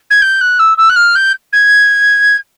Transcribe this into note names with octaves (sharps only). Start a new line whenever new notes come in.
G#6
G6
F#6
E6
E6
F#6
F6
G6
G#6